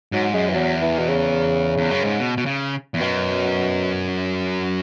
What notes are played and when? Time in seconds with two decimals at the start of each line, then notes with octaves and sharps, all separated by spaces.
0.12 G#2 F#3
0.34 F#2 G#3
0.50 E3
0.54 E2 F#3
0.81 E3
0.99 B2
1.08 C#3
1.78 E2
1.91 F#2
2.04 G#2
2.19 B2
2.37 B2
2.46 C#3
2.94 E2
3.00 F#2 B2